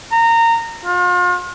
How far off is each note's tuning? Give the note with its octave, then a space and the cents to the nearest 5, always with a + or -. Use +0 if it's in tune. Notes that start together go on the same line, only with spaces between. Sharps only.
A#5 -20
F4 +40